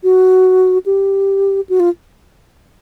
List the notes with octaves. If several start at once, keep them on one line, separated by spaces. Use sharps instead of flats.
F#4
G4
F#4
F4